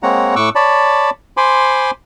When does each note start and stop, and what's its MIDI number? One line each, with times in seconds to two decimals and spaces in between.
0.03 0.35 56
0.03 0.35 58
0.03 0.35 60
0.03 0.35 73
0.03 0.35 78
0.03 0.35 82
0.36 0.49 45
0.36 0.49 85
0.36 0.49 86
0.36 0.49 88
0.36 0.49 90
0.55 1.10 73
0.55 1.10 74
0.55 1.10 81
0.55 1.10 83
1.37 1.91 72
1.37 1.91 80
1.37 1.91 83
1.37 1.91 84
1.37 1.91 86